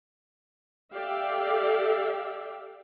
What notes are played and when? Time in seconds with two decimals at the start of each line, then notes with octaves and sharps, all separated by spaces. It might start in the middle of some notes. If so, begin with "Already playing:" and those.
0.93 G4 A4 D5 E5 F5 G5